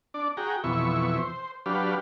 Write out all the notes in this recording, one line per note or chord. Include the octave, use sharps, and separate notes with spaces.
D4 D5
F#4 G#4 G5 A#5
F2 B2 E3 E5 C#6
C5
F#3 D4 G4 B4 F5